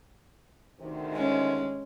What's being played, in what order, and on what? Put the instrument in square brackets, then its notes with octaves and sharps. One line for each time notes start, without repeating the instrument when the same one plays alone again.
[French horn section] D2 C3 D#3
[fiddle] G#3 C#4